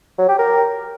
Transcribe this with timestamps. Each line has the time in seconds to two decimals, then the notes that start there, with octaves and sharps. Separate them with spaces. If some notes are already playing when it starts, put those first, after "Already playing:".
0.18 F#3
0.28 G4
0.38 A#4